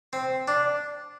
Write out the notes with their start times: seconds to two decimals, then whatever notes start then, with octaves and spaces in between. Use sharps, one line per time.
0.13 C4
0.48 D4